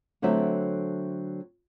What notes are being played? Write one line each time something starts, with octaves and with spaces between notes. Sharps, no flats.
D3 F#3 A3 C4 E5